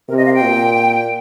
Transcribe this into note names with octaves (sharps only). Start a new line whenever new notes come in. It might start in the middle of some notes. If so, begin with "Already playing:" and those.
C3 A#4
D#5
F5
G5
A#2